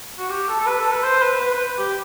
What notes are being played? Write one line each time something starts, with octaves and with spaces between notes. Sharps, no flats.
F#4
G4
A4
A4
B4
A4
B4
C5
B4
B4
B4
G4